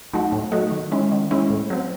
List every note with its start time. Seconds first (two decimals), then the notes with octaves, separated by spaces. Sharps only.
0.13 F#3 A3 D#4 F#4
0.32 A2
0.52 F#3 A3 D#4 F#4
0.71 D#3
0.92 G#3 C#4 E4
1.11 D#3
1.31 G#3 C#4 E4
1.50 A2
1.70 F#3 C4